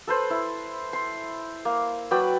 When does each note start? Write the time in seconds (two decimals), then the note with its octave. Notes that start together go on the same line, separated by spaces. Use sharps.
0.07 A4 B4 C5
0.30 E4
0.93 C6
1.65 A#3
2.11 F#3 B4 D5 G5